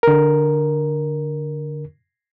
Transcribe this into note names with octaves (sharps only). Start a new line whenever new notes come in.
D3 A#4